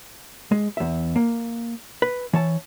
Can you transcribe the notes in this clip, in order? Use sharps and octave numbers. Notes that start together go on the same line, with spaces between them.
G#3
E2 E5
A#3
B4
E3 C#5 A5